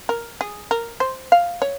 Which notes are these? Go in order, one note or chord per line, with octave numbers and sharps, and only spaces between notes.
A#4
G#4
A#4
C5
F5
C#5